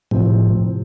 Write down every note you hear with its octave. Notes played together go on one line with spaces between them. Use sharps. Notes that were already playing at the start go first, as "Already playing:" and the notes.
F1 F2 A2 C3 F3 C4